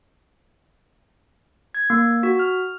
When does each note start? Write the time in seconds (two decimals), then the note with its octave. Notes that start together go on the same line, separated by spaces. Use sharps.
1.75 G#6
1.90 A#3
2.23 F#4
2.39 F6